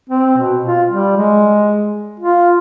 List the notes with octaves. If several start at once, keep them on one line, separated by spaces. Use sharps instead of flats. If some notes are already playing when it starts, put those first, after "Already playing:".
C4
B2
F4
G3
G#3
F4